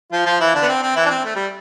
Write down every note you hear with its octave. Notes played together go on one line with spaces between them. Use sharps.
F3 F4
F3 F4
E3 E4
D3 D4
B3
C4
C4
E3 E4
D4
C4
A3
G3